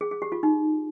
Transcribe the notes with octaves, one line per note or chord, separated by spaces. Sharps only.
G#4
G#4
G4
F4
D#4